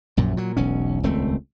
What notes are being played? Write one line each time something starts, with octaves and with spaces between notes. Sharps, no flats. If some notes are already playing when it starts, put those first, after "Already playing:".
A#1 F#2 A#2
A#2 F#3
E1 B1 C#4
D#1 C#2 A3 C4